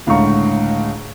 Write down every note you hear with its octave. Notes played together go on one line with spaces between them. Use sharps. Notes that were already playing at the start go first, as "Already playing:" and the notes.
C#2 A2 D3 F5 A#5 C#6